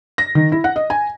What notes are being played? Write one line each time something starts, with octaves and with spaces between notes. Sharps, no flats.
A#6
D#3
E4
F#5
D#5
G#5